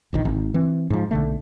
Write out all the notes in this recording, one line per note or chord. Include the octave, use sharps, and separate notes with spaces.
E1 A#1 D#3
G#1
E3 C4
G#2 F3
B1 D3 A3